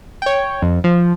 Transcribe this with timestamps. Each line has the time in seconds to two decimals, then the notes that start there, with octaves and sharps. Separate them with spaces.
0.22 C#5 G5
0.62 F2
0.84 F3